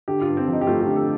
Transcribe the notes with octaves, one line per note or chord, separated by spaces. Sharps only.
D3 G4
F4
G2
C4
F3 D#4
G4
A3 F4
G4
D3
A4